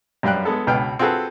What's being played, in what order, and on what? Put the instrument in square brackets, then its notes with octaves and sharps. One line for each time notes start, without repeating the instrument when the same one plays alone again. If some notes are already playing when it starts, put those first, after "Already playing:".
[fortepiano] F#2 G3 F5 G5 F#6
G#3 B3 A4
C#2 B2 B4 G5 F6
C4 F4 F#4 G#4 A4 B4